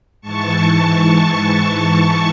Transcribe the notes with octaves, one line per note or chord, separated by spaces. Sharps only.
G#2 E3 A5 C#6